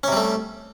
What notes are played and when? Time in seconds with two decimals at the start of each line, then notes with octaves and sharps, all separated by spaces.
0.04 C#4
0.08 C3
0.12 G3
0.17 A3